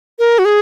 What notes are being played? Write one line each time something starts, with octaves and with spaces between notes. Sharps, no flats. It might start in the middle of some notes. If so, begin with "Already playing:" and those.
A#4
F#4
G#4